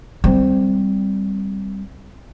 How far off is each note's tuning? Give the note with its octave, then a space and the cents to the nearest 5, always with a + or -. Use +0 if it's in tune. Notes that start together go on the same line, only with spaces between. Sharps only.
G3 +0 C4 +0